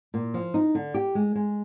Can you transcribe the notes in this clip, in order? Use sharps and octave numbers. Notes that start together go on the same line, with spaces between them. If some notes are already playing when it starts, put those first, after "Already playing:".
A#2
F3
D#4
D3
G4
G#3
G#3